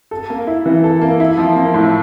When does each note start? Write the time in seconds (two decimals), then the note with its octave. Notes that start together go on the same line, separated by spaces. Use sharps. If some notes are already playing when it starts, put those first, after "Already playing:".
0.11 A4
0.30 A#3
0.47 E4
0.66 E3
0.84 A4
1.01 A#3
1.20 E4
1.38 F3
1.56 A#3
1.74 A2